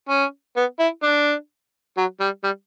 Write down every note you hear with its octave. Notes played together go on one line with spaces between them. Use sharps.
C#4
B3
E4
D4
F#3
G3
G3